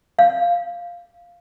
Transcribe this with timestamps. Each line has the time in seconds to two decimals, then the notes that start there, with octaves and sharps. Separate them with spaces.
0.19 F5